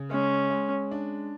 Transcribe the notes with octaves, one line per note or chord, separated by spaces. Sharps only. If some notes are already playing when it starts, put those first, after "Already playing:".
Already playing: C#3
G#3 C#4
G#3
D4